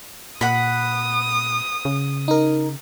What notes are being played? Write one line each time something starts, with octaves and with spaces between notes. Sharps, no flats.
A#2 F#5 B5 D#6
C#3
D#4 A#4